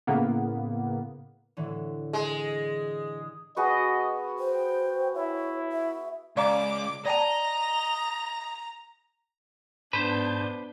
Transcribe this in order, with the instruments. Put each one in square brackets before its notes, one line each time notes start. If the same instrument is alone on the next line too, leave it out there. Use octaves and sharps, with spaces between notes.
[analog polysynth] A2 C#3 A#3 B3
[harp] A2 D3 E3
[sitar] G#3
[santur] B3 F#4 G#4 [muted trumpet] D#5
[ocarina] C5 [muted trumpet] G5
[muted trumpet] E4 [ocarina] C#5
[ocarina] E5
[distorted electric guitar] C#2 [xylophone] D5 F5 A#5 [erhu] D6
[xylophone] D5 G5 A5 [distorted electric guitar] D#5 [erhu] A#5
[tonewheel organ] G#2 A5 G6 [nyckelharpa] B3 D4 [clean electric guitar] B4 C5